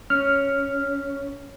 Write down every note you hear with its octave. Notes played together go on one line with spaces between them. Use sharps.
C#4 F6